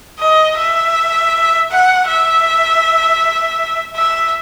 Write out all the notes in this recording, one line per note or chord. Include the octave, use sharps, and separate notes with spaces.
D#5
E5
F#5
E5
E5